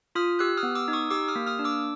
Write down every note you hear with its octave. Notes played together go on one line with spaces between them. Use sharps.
F4 D#6 F6
G4 E6 F#6
D#6 F6
B3
D6 E6
D#4
C#6 D#6
G4 D6 E6
D#6 F6
A#3
D#6 F6
D4
D6 E6